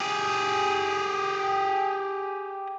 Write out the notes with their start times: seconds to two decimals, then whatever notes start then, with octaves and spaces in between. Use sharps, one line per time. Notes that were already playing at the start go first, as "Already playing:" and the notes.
0.01 G4 G#4